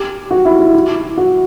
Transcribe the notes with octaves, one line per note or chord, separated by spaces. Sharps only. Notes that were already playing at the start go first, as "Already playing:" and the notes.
Already playing: G4
F#4
E4
E4
E4
F#4